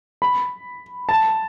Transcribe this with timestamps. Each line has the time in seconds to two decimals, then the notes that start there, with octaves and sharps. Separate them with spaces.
0.22 B5
1.09 A5